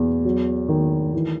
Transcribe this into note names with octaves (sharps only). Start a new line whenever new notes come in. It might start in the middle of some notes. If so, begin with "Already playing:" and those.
Already playing: E2 B2
F#3
D#3
E3